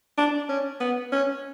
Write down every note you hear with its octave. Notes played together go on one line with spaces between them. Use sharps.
D4
C#4
B3
C#4